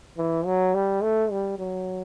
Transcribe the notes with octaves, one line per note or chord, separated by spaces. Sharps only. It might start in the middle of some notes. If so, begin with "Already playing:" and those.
E3
F#3
G3
A3
G3
F#3